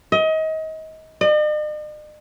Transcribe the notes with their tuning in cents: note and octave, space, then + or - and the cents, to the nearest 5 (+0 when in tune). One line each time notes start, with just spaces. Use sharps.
D#5 +30
D#5 -45